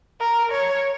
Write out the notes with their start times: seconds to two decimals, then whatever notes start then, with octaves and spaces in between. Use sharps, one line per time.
0.21 A#4
0.52 C#5